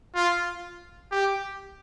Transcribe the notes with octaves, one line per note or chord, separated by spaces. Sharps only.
F4
G4